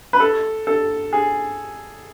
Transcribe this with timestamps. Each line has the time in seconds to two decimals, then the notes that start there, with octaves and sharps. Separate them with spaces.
0.13 B4
0.20 A4
0.67 A4
1.13 G#4